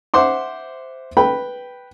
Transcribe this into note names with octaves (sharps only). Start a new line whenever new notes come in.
C5 E5 F#5 C6 D6
B4 G5 B5